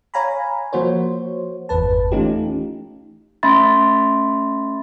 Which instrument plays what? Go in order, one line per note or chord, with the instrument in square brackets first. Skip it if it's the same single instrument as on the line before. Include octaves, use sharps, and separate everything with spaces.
[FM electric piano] C#5 F5 G#5 A#5 B5
F3 A#3 F#4 C5 C#5
G1 E2 B4 A5
E3 A3 C#4 D#4 F4 G4
[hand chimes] A3 C#4 E5 B5 C6 A6